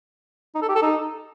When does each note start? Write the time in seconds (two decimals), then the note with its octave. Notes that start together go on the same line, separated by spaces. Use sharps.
0.55 D#4
0.62 A4
0.69 G4
0.75 A4
0.82 D#4